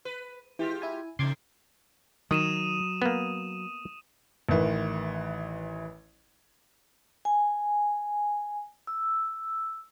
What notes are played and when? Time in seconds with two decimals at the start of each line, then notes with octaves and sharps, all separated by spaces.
0.05 B4
0.59 E3 G#3 F4 G4
0.82 E4 G#5
1.19 C#3 E3 A3 D#4 C6 D6 G#6
2.31 D#3 F#3 D#6 D#7 E7
3.02 A#3 B3
4.49 A1 D#3 E3
7.25 G#5
8.87 E6